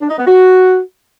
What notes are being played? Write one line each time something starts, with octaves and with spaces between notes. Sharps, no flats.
D4
D#4
B3
F#4